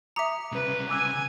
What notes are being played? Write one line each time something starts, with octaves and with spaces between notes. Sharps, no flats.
E5 A#5 D6 D#6 C#7
C2 C#3 B4
G#5 D6 E6 F#6